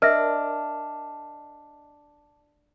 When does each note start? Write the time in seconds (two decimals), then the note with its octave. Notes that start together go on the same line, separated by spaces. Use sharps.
0.02 D4 A#4 D#5 E5 F6